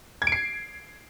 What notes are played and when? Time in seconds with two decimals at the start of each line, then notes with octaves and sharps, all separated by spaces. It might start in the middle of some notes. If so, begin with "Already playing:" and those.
0.22 G#6
0.27 D7
0.32 C7